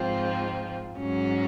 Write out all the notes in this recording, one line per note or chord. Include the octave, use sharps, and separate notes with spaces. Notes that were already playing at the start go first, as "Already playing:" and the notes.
Already playing: G#2 F3 C4 F4
G#2 F#3 C#4